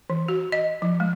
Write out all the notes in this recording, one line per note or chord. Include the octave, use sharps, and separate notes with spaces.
E3
F#4
D#5
F3
G#3